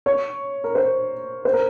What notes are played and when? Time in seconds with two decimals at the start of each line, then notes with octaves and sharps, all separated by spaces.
0.06 C#5
0.64 A#4
0.75 C5
1.45 C5
1.53 A#4